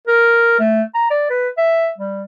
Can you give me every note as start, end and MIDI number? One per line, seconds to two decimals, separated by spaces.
0.07 0.59 70
0.59 0.82 57
0.94 1.08 82
1.10 1.26 74
1.30 1.49 71
1.57 1.90 76
1.98 2.23 55